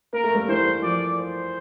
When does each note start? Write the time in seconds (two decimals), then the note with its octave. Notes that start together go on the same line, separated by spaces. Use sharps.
0.13 A#3 A#4
0.24 A3
0.34 G3 A#3
0.48 E3 G3 C5
0.83 F3 D5
1.18 C5